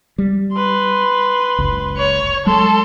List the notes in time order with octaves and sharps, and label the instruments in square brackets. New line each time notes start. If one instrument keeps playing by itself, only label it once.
[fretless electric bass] G3
[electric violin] B4 C6
[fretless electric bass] F#1 C#2
[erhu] C#5
[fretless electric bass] F#3 G#3 [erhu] A4 [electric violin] C6